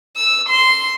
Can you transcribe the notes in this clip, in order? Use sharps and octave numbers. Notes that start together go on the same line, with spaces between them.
E6
C6